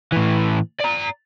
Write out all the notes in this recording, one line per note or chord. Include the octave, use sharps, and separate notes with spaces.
A2 E3
D5 A#5